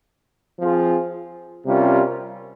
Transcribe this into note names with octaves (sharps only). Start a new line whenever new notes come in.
F3 C4 F4 G#4
C3 G3 C#4 F4 A#4